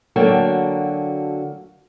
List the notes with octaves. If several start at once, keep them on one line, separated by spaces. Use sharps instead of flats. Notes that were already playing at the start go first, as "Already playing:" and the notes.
D3 F#3 A#3 F#4 G5 A5